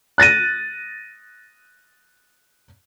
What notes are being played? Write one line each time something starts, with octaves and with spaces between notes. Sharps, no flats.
F#6 A6 A#6 D#7